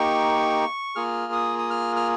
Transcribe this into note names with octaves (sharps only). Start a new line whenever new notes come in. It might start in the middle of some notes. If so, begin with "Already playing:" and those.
Already playing: A#3 D#4 G4 C#6
A#3 F4 G#4 F6
D#6
D#6
F6
F6